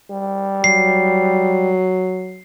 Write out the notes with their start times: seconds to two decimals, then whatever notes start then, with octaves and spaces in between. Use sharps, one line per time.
0.10 G3
0.64 F#3 C7